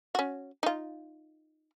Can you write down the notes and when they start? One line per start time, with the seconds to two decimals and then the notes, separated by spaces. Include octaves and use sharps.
0.15 C#4 F#4
0.63 D#4 F4